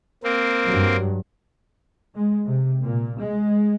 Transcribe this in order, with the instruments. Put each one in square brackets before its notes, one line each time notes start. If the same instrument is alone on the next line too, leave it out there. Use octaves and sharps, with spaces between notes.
[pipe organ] A#3 C4
[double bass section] G2 F#3
G#3
C3
A#2
G#3